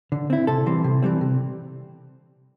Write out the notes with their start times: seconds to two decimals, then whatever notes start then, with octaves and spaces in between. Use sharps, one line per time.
0.12 D3
0.30 C4 E4
0.47 C3 A4
0.66 E3 G3 C4
0.84 C3
1.02 E3 G3 C4
1.21 C3